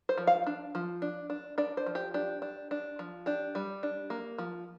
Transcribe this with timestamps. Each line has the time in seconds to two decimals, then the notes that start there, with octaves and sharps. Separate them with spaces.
0.09 C5
0.18 F3
0.27 F5
0.47 D4
0.75 F3
1.02 D4
1.30 D4
1.58 D4 D5
1.77 C5
1.86 F3
1.95 G4
2.14 D4 G4
2.42 D4
2.71 D4
2.99 F3
3.26 D4 G4
3.55 G3
3.83 D4
4.10 A#3
4.38 F3